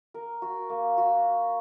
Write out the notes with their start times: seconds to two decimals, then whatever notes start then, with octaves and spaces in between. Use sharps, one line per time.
0.14 A#4
0.42 F#4
0.70 A#3
0.97 F#4